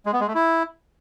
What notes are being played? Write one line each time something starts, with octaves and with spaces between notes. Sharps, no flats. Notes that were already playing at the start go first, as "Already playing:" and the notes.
G#3
B3
G#3
A3
E4